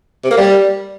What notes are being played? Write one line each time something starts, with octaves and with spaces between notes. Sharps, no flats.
C3
A#3
G3